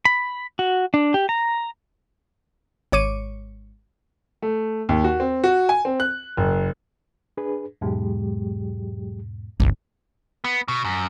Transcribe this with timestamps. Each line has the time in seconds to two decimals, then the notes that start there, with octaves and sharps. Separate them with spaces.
0.05 B5
0.59 F#4
0.94 D4
1.14 G4
1.29 A#5
2.92 G#1 C#5 D6 D#7
4.42 A3
4.89 D#2
5.04 F#4
5.20 C4
5.44 F#4
5.69 G#5
5.85 C4
6.00 F#6
6.37 F#1
7.37 D4 G#4 B4
7.81 E2 G#2 B2 F#3 G#3 G4
9.60 G1 C2
10.44 B3
10.68 B2
10.84 F#2